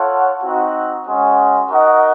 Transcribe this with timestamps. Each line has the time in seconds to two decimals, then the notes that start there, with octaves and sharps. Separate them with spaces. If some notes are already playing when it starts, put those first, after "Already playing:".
Already playing: F4 A4 C#5 F#5
0.42 C4 D#4 F#4
1.06 G#3 C#4 F#4
1.71 D#4 F#4 A#4 D#5 F#5